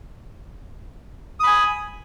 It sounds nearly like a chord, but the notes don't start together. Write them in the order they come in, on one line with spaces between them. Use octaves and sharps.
D#6 B5 G#5